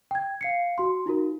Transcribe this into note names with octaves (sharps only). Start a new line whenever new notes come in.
G5 G#6
F5 C7 C#7
F#4 C6
D#4 F4 F#4 A#4